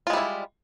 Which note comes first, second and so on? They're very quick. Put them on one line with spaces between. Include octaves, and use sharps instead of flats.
F4 G#3 G3 E4